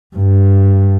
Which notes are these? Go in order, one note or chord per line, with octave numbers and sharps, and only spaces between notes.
G2